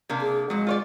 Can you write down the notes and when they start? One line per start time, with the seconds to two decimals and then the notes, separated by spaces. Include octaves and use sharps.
0.09 C3 A#3 D4
0.22 G#4
0.50 F2 F#3 G#3
0.67 F4 C#5 D5